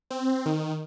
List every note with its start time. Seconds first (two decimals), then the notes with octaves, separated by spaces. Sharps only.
0.11 C4
0.46 D#3